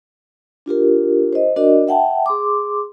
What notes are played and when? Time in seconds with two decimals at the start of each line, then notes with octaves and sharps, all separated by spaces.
0.66 D4 F4 G4 A#4
1.33 C5 D#5
1.56 D4 F#4 A#4 D5 D#5
1.88 E5 F#5 G5 A5
2.26 G#4 C6 D6